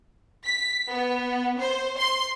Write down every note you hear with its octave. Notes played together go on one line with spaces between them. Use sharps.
B6
B3
C5
C6